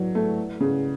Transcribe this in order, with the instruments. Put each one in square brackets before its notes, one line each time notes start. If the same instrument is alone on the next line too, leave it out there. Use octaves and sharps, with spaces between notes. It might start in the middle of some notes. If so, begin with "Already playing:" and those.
Already playing: [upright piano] F#3 [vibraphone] E4 B4 D5 F#5
[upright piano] A3
C#3